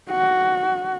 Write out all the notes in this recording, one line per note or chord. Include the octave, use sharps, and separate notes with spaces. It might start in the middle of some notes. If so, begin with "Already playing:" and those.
F#4